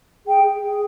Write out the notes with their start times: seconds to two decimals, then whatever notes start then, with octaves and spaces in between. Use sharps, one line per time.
0.25 G#4 G5
0.44 G#4
0.62 G#4